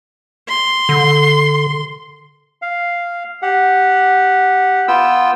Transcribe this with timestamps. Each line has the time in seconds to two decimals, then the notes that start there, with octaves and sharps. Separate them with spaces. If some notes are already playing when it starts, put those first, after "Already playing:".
0.48 C6
0.89 D3
2.62 F5
3.42 G4 F#5
4.88 B3 F4 G5 E6